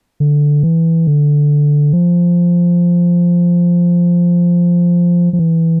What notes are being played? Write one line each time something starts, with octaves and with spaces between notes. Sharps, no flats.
D3
E3
D3
F3
F3
E3